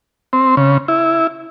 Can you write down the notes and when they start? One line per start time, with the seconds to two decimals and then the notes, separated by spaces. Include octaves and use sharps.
0.33 C4
0.57 C#3
0.88 E4